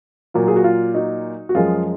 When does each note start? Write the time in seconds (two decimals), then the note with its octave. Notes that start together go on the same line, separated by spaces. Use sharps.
0.34 A#2 F#3 F4
0.48 G#4
0.56 F#4
0.64 F4
0.95 D#4 F#4
1.49 F#4
1.55 F#2 F3 G#3 F4 G#4